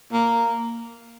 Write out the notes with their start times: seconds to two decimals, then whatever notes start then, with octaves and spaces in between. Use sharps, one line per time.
0.13 A#3